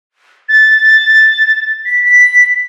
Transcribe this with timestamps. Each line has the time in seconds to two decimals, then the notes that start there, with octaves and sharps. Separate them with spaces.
0.49 A6
1.85 B6
2.04 B6